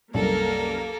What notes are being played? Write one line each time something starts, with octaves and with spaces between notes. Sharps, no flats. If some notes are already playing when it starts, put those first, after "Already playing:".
C2 F#2 A#3 A4 A#4